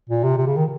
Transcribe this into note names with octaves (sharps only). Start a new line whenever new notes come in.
A#2
C3
C3
C#3
D#3